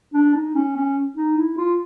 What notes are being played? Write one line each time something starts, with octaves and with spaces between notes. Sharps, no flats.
D4
D#4
C#4
C#4
D#4
E4
F4